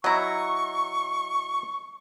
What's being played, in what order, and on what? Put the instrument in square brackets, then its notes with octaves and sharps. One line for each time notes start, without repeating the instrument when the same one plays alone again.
[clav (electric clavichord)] F#3 E4 [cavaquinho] D#5 A#5 [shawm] C#6